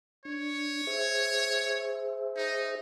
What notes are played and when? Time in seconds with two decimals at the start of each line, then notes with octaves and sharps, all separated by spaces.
0.25 D4 C#5
0.87 G#4 C5 E5
2.37 D#4